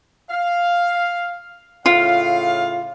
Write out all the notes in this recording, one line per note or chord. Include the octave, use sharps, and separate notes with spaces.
F5
A2 C#3 F4 F5